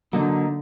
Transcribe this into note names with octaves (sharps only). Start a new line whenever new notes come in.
D3 F#3 A#3 D#4